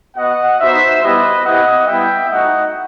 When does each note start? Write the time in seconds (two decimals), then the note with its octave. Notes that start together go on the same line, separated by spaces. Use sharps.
0.16 B3 F#4 D#5 F#5
0.59 B3 D#4 F#4 C5 E5
1.03 G3 B3 E4 G4 B4 D#5
1.45 C4 E4 G4 D#5 F#5
1.87 G3 B3 E4 E5 G5
2.30 A3 D#4 F#4 D#5 F#5